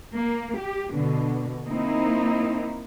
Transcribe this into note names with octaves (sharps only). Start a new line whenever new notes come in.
A#3
G4
B2 D3
A#3 C4 D#4 E4